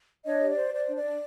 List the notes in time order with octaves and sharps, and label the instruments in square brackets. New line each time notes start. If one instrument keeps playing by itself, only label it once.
[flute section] D4 C#5 D#5
G4
D5
C5
C5 D5
D4
D5
D4